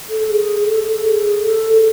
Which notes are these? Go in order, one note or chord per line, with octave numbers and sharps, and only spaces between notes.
A4
G#4
A4
G#4
A4